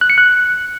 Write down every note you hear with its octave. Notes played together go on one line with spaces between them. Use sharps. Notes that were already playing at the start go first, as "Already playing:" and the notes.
F#6
C#7
F#6